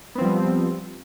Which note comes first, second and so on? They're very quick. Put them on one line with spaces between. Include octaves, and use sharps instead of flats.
B3 C4 F3 G3